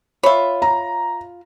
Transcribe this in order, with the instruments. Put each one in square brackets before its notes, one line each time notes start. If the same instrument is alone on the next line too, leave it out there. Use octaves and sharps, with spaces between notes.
[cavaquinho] F4 B5 [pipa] C#5 E5
[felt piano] A#5